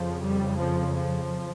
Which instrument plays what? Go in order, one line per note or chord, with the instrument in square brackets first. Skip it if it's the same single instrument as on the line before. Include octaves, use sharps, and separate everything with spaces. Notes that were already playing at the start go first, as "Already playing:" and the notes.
Already playing: [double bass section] F2 C#3 F3
G3
F3
F3